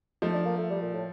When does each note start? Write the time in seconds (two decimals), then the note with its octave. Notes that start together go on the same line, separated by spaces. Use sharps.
0.22 F3 A3 D#4
0.34 D4
0.45 A#3
0.58 A3
0.70 G3
0.82 A#2
0.94 A2